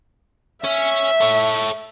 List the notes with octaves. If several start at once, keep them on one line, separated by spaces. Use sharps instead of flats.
C#4 E5
A4 C#5